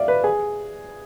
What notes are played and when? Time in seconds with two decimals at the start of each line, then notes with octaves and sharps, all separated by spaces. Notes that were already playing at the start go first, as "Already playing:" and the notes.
Already playing: D5 E5 F5
0.08 B4
0.24 G#4